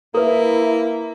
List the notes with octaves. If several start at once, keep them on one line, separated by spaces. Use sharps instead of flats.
A#3 E4 A4 B4